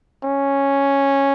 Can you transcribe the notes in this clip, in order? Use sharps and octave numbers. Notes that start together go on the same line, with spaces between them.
C#4